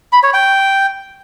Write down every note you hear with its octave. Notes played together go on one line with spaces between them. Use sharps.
B5
C#5
G5